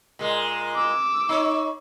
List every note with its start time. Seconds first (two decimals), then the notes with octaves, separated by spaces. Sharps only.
0.19 A#2 G#3
0.75 D6 E6
1.29 D#4 C#5